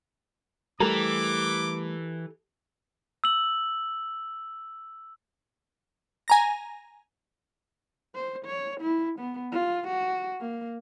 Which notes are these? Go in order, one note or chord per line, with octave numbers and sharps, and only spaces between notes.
E3 G3 A3 G4 A4 A#4 D6
E6 F#7
G#5 A#5 A#6
C5
C#5
E4
B3
F4
F#4
A#3